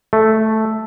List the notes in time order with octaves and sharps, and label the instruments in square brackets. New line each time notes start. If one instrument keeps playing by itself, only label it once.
[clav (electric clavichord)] A3